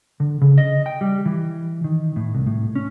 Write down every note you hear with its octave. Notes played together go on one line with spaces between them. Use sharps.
D3
C#3
D#5
G5
G3
E3
D#3
A2
C2
A2
C#4